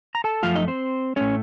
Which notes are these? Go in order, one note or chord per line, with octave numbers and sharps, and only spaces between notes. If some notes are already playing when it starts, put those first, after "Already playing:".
A#5
A4 A5
F#2 F3 A3 F4 F5
D#4 D#5
C4 C5
A2 A3 C#4 C#5